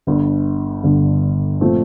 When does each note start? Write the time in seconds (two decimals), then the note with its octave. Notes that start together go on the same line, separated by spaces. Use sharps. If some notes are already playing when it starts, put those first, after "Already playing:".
0.07 G1 G2 D3
0.84 G1 G2 D3
1.61 A#2 F3 A3 C4